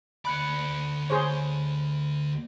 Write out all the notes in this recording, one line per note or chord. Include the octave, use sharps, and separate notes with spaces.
D2 D5 B5 F#6 C#7
G#4 C5 C#5